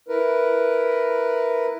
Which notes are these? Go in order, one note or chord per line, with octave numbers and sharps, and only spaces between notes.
E4 A#4 B4